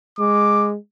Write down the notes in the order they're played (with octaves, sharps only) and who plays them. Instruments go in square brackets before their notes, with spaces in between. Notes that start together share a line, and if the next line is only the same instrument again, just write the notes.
[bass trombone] G#3 [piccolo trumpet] D6